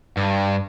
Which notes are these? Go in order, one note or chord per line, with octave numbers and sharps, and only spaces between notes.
G2